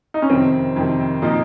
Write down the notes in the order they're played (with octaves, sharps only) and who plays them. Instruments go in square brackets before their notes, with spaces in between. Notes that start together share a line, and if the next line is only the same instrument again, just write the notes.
[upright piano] D#4
C#4
[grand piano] F2 C3 D#3 [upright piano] C4
[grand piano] F2 C3 D#3
[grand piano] A#2 F3 A#3 [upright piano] D#4